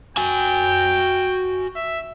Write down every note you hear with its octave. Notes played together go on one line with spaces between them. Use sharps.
F#4 G5 G#5
E5